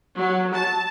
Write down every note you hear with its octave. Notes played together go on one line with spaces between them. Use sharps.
F#3
A5